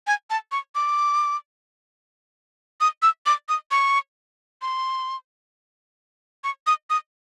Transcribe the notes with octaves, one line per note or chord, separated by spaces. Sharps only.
G#5
A5
C#6
D6
D#6
E6
D6
D#6
C#6
C6
C#6
D#6
D#6